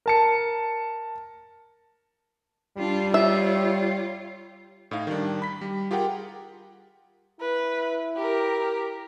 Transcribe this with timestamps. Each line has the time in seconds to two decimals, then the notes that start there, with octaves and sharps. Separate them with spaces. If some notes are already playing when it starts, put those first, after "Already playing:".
0.06 A#4 A5 C#7
2.78 G3 D4 F4
3.14 F4 C#5 E5
4.91 A2 D#4 F5
5.07 D#3 G3 D4
5.42 B5 B6
5.61 G3
5.91 F4 G4 G#4 A#4 F#5 G5
7.41 E4 B4
8.17 G4 A#4